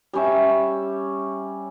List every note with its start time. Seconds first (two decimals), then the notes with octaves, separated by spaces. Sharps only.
0.13 G3 C#4 E5